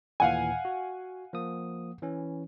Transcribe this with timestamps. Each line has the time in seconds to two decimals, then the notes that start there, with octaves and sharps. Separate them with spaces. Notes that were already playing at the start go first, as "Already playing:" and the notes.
0.20 D#2 A#2 E3 F5 F#5 G#5
0.65 F#4
1.33 F3 A#3 D#6
2.02 E3 C#4